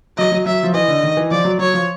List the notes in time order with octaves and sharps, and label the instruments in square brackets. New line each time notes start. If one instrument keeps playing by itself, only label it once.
[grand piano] F#3 [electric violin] D#5
[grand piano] F#3
[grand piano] F#3 [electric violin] E5
[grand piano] F3
[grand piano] E3 [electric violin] D#5
[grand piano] D3
D#3
E3
[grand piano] F3 [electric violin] D5
[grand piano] F#3
[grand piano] F#3 [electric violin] C#5
[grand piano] F3